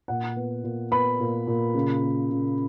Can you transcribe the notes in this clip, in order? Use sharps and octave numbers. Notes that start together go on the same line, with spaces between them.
A#2 F#5
B3
A#2
B3 B5
A#2
A#2
C#3
A#3
C#3